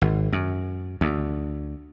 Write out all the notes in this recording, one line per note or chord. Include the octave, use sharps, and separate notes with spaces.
G#1
F#2
D2